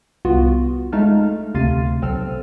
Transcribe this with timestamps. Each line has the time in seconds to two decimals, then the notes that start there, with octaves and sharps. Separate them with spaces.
0.25 C2 B3 F4 F#4
0.93 G#3 A3 D#4 F5 A5 F6
1.55 D2 C3 F5 C6 A6 D#7
2.02 B1 C4 A4 E6 F6